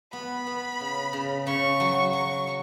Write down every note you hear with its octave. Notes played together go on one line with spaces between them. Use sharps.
B3 B5
B3
C#3
C#3
C#3 C#6
F#3
F#3 C#6
F#3